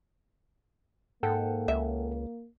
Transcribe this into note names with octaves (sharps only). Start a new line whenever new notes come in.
G#2 A#3 A4 F#5 G5
C#2 E5